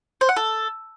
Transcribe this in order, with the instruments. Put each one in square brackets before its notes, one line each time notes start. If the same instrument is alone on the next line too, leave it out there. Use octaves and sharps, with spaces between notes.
[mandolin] C5
F#5
A4